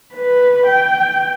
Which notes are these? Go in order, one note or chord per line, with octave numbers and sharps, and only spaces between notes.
B4
G5